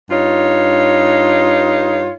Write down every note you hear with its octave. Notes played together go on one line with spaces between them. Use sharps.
G2 D#4 F4 C#5